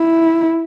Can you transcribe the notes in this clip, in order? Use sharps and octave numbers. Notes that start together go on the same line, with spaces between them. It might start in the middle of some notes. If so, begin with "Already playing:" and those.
Already playing: E4